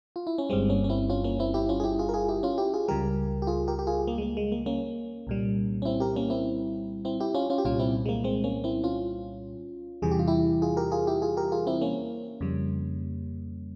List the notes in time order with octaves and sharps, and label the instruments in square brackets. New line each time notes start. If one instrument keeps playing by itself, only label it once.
[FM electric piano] F4
E4
C#4
G1 G2 G3 G#3 C4
A#3 C#4
C#4
C4 E4
C#4 F4
A#3 C#4
C4 E4
E4 G4
C#4 F4
G#4
E4 G4
F4 G#4
A#4
F4 G#4
E4 G4
C#4 F4
E4 G4
F4 G#4
C#2 C#3 G3 G4 A#4
G4
F4 G#4
G4 A#4
G4
F4 G#4
A#3
G#3
A#3
G#3
A#3
A#3 C#4
C2 A#2 G3
C#4
C4 E4
G4 A#4
A#3 C#4
C4 E4
C4 E4
E4 G4
C#4 F4
C#4 F4
G4
C2 A#2 G3 C#4 F4
C4 E4
G#3
A#3
G#3 C4
A#3 C#4
C4 E4
C#4 F4
E2 C3 E3 G3 G#4
G4
F4
E4 G4
F4 G#4
G4 A#4
F4 G#4
E4 G4
F4 G#4
G4 A#4
F4 G#4
C4 E4
A#3 C#4
F2 C#3 G3